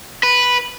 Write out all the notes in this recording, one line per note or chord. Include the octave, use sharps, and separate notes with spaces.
B4